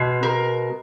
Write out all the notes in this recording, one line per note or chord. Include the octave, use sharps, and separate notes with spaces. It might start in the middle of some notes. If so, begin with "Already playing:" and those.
Already playing: B2 G#3
A#4